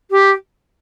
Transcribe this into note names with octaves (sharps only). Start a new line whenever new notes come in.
G4